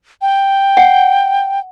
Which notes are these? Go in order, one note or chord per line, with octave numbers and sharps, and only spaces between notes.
G5
F#5